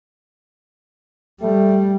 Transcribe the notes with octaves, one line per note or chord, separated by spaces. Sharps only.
G3 A3